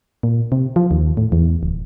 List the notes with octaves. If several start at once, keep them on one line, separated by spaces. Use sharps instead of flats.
A#2
C3
F3
D#2
A2
E2
D1